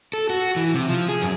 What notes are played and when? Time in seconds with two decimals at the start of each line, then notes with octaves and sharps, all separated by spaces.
0.13 A4
0.30 F#4
0.56 E3
0.74 C3
0.89 F3
1.08 G#4
1.22 F#2